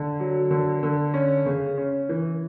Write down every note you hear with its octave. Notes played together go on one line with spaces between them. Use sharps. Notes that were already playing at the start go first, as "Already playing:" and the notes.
Already playing: D3
F#3
D3
D3
C#4
C#3
C#4
E3